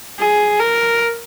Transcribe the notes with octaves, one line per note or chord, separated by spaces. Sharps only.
G#4
A#4